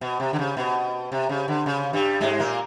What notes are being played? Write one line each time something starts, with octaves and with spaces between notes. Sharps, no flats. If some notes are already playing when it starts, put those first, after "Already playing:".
B2
C3
D3
C#3
B2
C3
C#3
D3
C#3
G2 G3
G#2 G#3
A#2 A#3